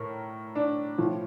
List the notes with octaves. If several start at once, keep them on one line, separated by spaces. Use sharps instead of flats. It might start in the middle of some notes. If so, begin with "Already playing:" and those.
Already playing: A2 A#4
D4
A2 F3